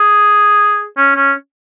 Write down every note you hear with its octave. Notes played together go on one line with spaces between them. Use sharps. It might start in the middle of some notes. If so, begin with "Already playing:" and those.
Already playing: G#4
C#4
C#4